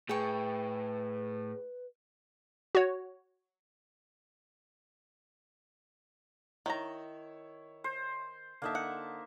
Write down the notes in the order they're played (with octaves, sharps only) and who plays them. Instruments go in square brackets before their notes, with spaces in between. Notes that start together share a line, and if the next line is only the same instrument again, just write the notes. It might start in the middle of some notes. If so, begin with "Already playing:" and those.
[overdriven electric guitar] A2 [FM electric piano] G#4 [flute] B4 [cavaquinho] G5 C#6
[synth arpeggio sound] F#4 C#5
[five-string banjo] D#3 A#5 [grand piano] E4 C#5
[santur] C5
[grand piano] D3 A5 [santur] A#3 D#4 E5
[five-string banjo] F#5